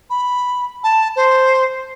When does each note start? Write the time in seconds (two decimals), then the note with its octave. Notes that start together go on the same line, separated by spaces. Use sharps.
0.10 B5
0.84 A5
1.16 C5